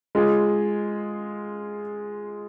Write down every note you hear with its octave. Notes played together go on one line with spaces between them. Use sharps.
G#3 F4 G#4